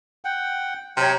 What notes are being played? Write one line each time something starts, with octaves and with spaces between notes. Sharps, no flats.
F#5 G5
C3 F#3 C#5 G5 A#5